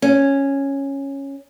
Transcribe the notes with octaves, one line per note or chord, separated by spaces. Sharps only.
C#4